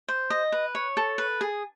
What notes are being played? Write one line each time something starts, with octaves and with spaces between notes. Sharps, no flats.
C5
D#5
B4
C#5
A4
B4
G#4